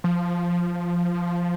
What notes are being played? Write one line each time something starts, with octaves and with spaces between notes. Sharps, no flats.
F3